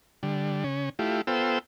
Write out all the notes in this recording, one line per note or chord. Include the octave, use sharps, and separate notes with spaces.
D3 G3
C#3 C#4
A3 E4 F4 G4
B3 F4 A4 C5 G5 E6